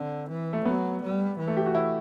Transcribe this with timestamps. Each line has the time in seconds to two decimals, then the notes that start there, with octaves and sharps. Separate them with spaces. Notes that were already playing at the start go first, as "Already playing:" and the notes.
Already playing: D3 C4
0.30 E3
0.53 A3
0.65 F#3 B3
1.02 G3
1.38 E3
1.48 A3
1.57 G4
1.66 F#4
1.75 E4